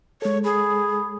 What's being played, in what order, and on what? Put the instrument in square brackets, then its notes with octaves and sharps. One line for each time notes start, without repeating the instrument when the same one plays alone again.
[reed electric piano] G#3 A4 [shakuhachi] C#5
[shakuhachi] G#4 [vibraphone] B5 D#6